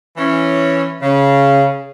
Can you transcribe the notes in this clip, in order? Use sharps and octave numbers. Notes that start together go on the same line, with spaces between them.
E3 C#4
C#3